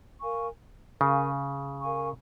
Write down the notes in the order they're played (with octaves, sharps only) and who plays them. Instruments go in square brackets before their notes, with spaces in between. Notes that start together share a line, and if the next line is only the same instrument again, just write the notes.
[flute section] A#4 F5 G#5 C#6
[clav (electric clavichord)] C#3 [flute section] A#4 F5 G#5 C#6
[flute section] A#4 F5 G#5 C#6